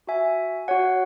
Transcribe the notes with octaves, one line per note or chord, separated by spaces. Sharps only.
F#4 E5 G#5
F#4 C#5 F#5